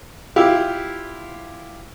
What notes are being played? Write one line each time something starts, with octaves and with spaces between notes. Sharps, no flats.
E4 F4 G4 F5